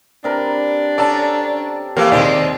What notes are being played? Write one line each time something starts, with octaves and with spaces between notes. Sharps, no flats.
C3 D4 A#4 B4
C#4 A4 D5 A5 A#5
E3 F3 A3 A#3 G4 F5
D#2 C3 G#3 C4 D5